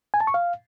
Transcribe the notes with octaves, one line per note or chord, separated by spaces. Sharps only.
G#5
A5
C#6
F5